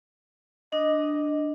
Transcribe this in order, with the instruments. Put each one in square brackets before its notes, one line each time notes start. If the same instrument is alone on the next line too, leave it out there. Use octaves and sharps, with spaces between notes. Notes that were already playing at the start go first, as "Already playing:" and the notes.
[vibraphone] D4 [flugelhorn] D#5